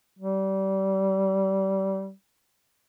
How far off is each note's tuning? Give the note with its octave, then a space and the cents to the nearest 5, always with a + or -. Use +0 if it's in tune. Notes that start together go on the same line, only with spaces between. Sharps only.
G3 -25